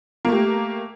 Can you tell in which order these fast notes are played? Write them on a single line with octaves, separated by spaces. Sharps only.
A#3 A3 G4